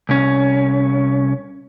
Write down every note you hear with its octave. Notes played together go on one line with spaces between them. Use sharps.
C2 C#4